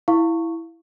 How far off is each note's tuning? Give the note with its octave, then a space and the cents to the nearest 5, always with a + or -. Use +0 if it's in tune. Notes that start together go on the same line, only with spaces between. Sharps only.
E4 +0 F5 +0 C#6 +0